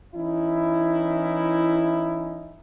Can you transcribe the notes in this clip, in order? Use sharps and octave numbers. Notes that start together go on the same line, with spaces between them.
E3 C#4 D#4 E4